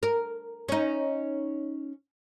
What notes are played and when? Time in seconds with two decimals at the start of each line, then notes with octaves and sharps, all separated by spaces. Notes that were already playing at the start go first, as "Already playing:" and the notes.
0.03 A#4
0.68 C#4 D#4